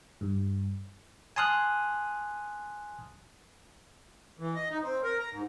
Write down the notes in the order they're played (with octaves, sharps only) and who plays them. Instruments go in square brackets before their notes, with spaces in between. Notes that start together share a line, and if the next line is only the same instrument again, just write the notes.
[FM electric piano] G2
[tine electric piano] G#5 A5 C6 D#6 F6 F#6
[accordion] E3
D#5
D#4
C4
A#4
A#5
G#2